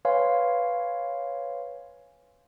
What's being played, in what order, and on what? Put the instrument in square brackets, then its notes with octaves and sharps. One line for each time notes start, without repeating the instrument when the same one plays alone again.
[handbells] B4 C#5 F5 G#5 C6